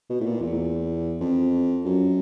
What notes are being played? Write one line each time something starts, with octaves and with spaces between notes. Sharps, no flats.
B2
A2
A#2
E2
F2
F#2